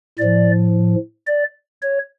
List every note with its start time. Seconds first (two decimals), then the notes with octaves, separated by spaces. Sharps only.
0.19 A2 F3 D5
1.27 D5
1.82 C#5